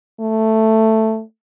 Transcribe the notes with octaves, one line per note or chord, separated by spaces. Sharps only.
A3